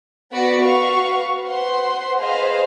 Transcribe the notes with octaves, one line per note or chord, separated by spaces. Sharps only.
B3 F#4 D5 B5 C#7
F#4 B4 F5 C#6
B4 C5 F#5 C6
G#4 B4 C5 D#5 F5